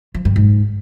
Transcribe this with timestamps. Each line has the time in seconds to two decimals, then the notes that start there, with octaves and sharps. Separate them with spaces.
0.14 F3
0.25 G2
0.36 G#2